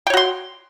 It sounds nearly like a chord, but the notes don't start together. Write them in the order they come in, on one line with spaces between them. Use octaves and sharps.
G5 C#5 F#4 C6